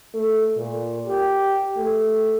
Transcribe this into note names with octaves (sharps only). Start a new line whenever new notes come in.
A3
A#2
G4
A3